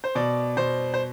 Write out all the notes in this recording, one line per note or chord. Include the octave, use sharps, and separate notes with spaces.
C5
B2 D5
B2 C5
C5